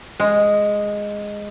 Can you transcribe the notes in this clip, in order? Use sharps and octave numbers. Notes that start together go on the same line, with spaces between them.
G#3